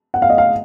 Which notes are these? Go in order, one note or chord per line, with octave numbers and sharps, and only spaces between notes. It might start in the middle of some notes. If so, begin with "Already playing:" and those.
F#5
F5
D#5
F5